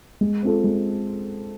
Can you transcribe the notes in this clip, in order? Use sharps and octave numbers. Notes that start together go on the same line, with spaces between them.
G#3
C4 F4 A4
G#3